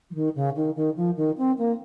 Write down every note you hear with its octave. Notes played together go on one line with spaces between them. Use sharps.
F3
D#3
C#3
D#3
D#3
F3
D#3
C4
A#3